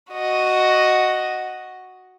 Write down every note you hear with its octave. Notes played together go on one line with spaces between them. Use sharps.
F#4 D#5